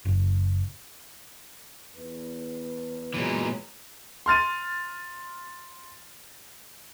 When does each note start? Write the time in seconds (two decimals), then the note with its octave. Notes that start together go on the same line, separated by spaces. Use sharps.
0.05 F#1
1.95 E2 B4
3.14 A#2 E3 F#3 G#3 B3
4.26 C6 F6 A6 D#7